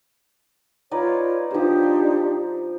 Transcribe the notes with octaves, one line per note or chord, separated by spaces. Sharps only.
D#4 F4 B4 C#5 D5
F3 D4 D#4 G4 C5
C6